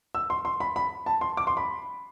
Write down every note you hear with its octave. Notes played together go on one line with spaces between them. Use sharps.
E6
C6
C6
B5
B5
A5
C6
D6
C6
B5